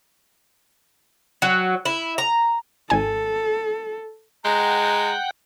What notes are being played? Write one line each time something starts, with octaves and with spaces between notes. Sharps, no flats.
F#3
E4
A#5
G#1 A4 G#5
G#3 F#5 G5 A#5